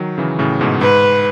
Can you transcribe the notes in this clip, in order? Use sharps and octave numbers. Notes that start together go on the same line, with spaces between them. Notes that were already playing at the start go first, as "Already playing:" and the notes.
Already playing: D#3 F#3
C#3 E3
A2 C#3
G#2 B2
G#2 B4